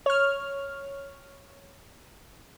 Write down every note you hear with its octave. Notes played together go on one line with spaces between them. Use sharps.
C#5 F6